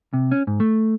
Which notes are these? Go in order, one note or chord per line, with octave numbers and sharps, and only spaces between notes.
C3
C#4
G#2
A3